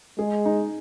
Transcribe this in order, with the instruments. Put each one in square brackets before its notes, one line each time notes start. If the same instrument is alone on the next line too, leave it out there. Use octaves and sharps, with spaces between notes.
[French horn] G#3 [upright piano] G#4
[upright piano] D#4